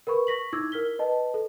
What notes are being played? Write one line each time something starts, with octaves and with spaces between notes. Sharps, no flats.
A#4 B4 B5 C#6
C#6 A#6 B6 F#7
D#4 E4 D6 E6 G#6
A#4 F6 B6 G7
B4 D#5 A5
A4